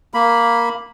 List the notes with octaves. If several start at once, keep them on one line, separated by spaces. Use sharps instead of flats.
A#3 B5